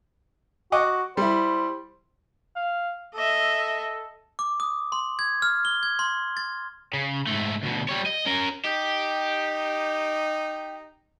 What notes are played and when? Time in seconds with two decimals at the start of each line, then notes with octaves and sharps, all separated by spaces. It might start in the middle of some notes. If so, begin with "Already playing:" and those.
0.72 F#4 D#5 F#5 D6
1.17 G3 E4 C5
2.56 F5
3.14 A4 D#5 E5
4.39 D6
4.60 D#6
4.92 C6
5.19 G#6
5.42 F6
5.65 G7
5.83 G#6
5.99 C6
6.37 A6
6.94 C#3
7.27 G#2 A3
7.63 D2 B2
7.89 G3 C#5
8.06 D#5
8.26 C#4 A#4
8.64 D#4 G4